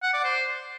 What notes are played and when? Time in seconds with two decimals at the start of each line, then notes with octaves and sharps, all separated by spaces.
0.03 F#5
0.13 D5
0.24 C5